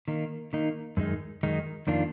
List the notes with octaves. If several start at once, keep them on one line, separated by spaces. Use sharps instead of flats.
D#3 A#3 D#4
D#3 A#3 D#4
F#2 D#3 G#3 D#4
F#2 D#3 G#3 D#4
F2 D#3 A#3 D4 F4